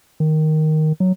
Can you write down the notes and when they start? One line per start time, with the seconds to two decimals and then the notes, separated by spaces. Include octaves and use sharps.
0.20 D#3
1.00 F#3